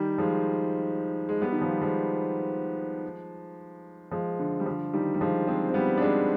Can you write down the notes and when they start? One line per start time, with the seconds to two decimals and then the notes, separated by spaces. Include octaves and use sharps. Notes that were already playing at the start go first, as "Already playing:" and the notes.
Already playing: D#3 G3
0.18 F3 G#3
1.29 G#3
1.41 G3 B3
1.52 D#3
1.62 F3
1.71 G3
1.81 F3 G#3
4.12 F3 G#3
4.39 D3
4.60 G3
4.66 D3 F3
4.93 D#3 G3
5.14 G3
5.21 F3 G#3
5.47 G#3 C4
5.69 C4
5.74 G3 B3
5.98 D4
6.01 G#3 C4